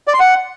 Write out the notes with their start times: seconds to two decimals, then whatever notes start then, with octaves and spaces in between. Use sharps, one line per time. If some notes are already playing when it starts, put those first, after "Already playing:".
0.08 D5
0.14 C6
0.20 F#5